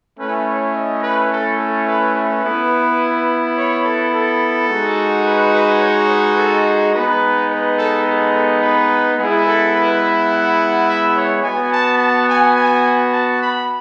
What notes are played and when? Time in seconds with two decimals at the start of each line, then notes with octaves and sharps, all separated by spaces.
0.18 A3 C#4 E4 B4
0.47 C#5
0.75 D#5
1.03 B4
1.31 A4
1.59 A4
1.87 B4
2.15 B4
2.44 B3 E4
3.56 C#5
3.84 A4
4.13 A4
4.68 G#3 D#4 F#4
5.25 B4
5.53 B4
5.81 C#5
6.10 B4
6.37 A4
6.65 G#4
6.93 G#3 B3 D#4 B4
7.50 B4
7.78 A4
8.07 A4
8.34 A4
8.62 B4
9.18 G#3 B3 E4 G#4
9.47 A4
9.74 B4
10.02 E5
10.31 F#5
10.88 E5
11.15 C#5
11.44 B3 F#4 G#5
11.72 A5
11.99 A5
12.28 G#5
12.56 G#5
13.12 A5
13.41 B5